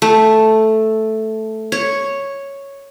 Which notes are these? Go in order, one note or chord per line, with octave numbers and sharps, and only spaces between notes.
A3
C#5